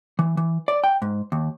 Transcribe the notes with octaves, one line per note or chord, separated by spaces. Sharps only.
E3
E3
D5
G5
G#2
D#2